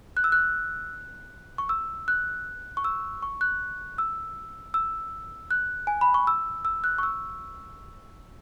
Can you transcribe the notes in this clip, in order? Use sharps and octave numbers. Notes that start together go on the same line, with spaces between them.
F#6
E6
F#6
C#6
E6
F#6
C#6
E6
C#6
F#6
E6
E6
F#6
G#5
B5
C#6
E6
E6
F#6
C#6
E6